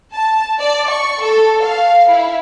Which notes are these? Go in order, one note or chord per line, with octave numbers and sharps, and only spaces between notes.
A5
D5
C#6
A4
F5
E4